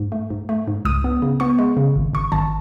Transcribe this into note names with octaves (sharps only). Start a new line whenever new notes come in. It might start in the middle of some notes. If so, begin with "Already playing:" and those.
Already playing: G#2
A3
G#2
A3
G#2
C#2 D#6
B3
C#3
B3 C#6
G#3
C#3
G#1
G#1 C#6
G#1 A5